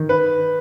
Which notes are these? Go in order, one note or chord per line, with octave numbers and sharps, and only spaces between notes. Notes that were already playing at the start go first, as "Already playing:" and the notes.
Already playing: D#3
B4